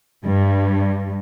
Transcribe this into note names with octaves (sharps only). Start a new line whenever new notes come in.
G2